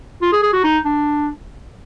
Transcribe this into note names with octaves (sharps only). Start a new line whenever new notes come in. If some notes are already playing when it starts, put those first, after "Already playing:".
F4
G#4
G#4
F#4
D#4
D4